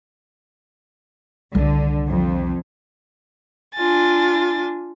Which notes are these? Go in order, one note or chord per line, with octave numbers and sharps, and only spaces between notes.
C2 D3 D#3
F2
D4 F4 G#5 A6